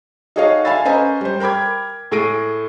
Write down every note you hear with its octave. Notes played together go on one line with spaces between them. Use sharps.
D#4 F#4 G#4 C#5 D#5 F5
E5 F5 G#5 B5 E6 A6
C#4 B4 C5 D#5 G#5 A#5
G3 C5
A#4 G5 B5 D6 G#6
A2 G#4 A#6 D7 D#7